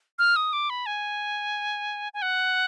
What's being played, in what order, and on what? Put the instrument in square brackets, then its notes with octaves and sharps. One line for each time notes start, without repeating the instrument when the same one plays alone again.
[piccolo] F6
D#6
D6
B5
G#5
G#5
F#5